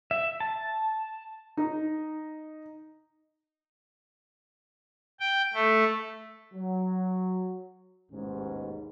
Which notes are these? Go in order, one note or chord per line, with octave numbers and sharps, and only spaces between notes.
E5
A5
D#4
G5
A3
F#3
A1 D#2 G#2 B2 G#3 C#4